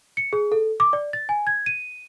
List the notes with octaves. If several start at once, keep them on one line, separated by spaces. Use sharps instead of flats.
C#7
G#4
A4
D6
D5
A6
G#5
G#6
D#7